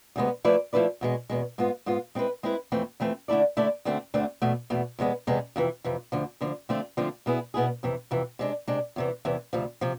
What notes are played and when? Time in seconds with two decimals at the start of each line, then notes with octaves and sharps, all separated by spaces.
0.16 D2 C3 G#3 B3
0.45 F3 A3 E4 B4 D5
0.73 F3 A3 E4 B4 D5
1.01 E2 B2 G#3
1.30 E2 B2 G#3
1.58 G#2 G#3 B3 F4
1.86 G#2 G#3 B3 F4
2.15 G#3 C4 E4 B4
2.43 G#3 C4 E4 B4
2.72 F2 E3 A3 C4
3.00 F2 E3 A3 C4
3.28 D3 A3 E4 A4 D5
3.57 D3 A3 E4 A4 D5
3.85 D2 D3 A3 C4
4.14 D2 D3 A3 C4
4.42 E2 B2 A3
4.70 E2 B2 A3
4.99 E2 C3 G#3 B3
5.27 E2 C3 G#3 B3
5.56 F2 C3 E3
5.84 F2 C3 E3
6.12 D2 D3 F3
6.41 D2 D3 F3
6.69 D3 F3 A3 C4 F4
6.97 D3 F3 A3 C4 F4
7.26 B2 B3 E4 G#4
7.54 B2 B3 E4 G#4
7.83 F2 C3 E3
8.11 F2 C3 E3
8.39 C3 G#3 D4
8.68 C3 G#3 D4
8.96 E2 C3 E3
9.25 E2 C3 E3
9.53 D2 C3 F3
9.81 C3 F3